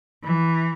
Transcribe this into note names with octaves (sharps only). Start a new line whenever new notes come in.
E3